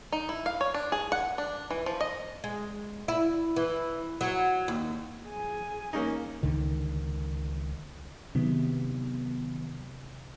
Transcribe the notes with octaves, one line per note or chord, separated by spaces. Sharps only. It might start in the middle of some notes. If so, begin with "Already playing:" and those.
D#4
E4
F5
C#5
D4
G#4
F#5
D4
E3
F3
D#5
G#3
E4
E3
F#3
D#2
G#4 G#5
A#3 C#4 D#4
C#2 D3 D#3
C3 D#3 F#3 B3